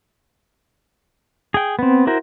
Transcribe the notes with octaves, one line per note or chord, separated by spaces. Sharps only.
G#4 G5
B3 C4
E4 F#4 A#4 C5